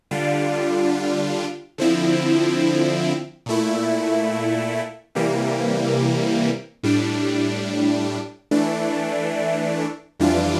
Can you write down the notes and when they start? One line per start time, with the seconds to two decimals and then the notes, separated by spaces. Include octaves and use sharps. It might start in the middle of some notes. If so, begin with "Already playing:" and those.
0.11 D3 G3 D4 F4
1.78 D3 F3 C4 E4
3.46 A#2 A3 E4
5.15 C3 E3 G3 A#3
6.83 A2 G3 D4
8.51 E3 A3 D4
10.19 F2 E3 G3 D4 F4